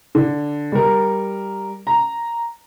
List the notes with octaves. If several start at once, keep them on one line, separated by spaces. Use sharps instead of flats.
D3
G3 A#4
A#5